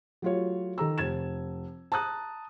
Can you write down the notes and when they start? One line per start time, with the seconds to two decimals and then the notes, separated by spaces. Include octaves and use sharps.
0.22 F#3 A3 F4 G4 C#5
0.78 D#3 A4 A#5 E6
0.98 F1 G#6 E7
1.92 A5 A#5 D#6 F#6